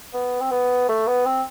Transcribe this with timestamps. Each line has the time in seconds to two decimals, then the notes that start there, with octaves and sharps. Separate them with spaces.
0.14 B3
0.41 C4
0.51 B3
0.89 A3
1.08 B3
1.26 C4